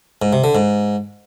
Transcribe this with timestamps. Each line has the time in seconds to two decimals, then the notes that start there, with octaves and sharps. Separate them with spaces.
0.22 G#2
0.33 C3
0.44 D3
0.55 G#2